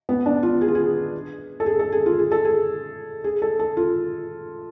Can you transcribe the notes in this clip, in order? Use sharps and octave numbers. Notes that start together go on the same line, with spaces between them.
B3
D4
F4
G#4
F4
G#4
A4
G#4
A4
G#4
F4
G#4
A4
G#4
G#4
A4
A4
F4